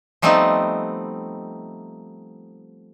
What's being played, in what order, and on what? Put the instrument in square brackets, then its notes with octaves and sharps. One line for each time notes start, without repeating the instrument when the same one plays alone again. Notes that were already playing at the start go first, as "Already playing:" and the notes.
[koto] F3 G3 A3 B3 C4 D#4